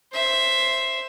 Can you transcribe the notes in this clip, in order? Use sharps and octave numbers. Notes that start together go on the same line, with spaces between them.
C5 E5